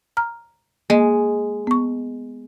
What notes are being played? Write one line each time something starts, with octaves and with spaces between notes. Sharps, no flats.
A#5 F6
G#3 A#3
B3 C#6